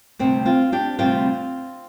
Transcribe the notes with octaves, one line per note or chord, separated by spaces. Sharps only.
D2 C3 G3 C4
C4 F4
D4 G4
D2 C3 G3 C4 F4